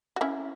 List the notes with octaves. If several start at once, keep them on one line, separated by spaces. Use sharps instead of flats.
F#4
C#4 E4